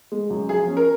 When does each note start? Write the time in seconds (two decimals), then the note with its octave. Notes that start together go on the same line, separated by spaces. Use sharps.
0.12 G#3
0.30 F#2
0.49 F3 G#4
0.67 C#4
0.77 A#4